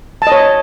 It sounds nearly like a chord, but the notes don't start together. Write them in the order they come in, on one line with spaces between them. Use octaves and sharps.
A5 D#5 C#5